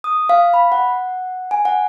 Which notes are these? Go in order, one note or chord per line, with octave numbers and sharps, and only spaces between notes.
D#6
F5
B5
F#5
G#5
F#5